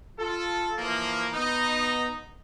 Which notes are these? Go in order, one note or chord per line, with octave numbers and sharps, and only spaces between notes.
F4 A4
E3 F3 A#3
B3 D#4